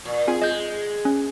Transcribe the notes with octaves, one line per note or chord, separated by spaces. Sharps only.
A#2
C4 F4 G#4 G#5
G#3 D#5 G6
C#4